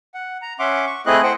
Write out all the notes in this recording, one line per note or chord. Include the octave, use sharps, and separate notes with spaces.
F#5
A#5
C#4 E5 F#5 C6 D6
C#6
A3 C4 E4 G#4 D#5 F#6
C5 F#5 G5